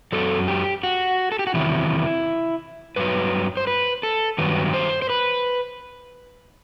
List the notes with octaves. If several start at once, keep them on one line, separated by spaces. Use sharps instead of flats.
F#2 F#3 A4
G4
F#4
A4
G4
F#4
E2 C3 D#3 F#3 E4
G2 F#3 B4
C5
B4
A4
G2 D#3 F#3 B4
C5
C5
B4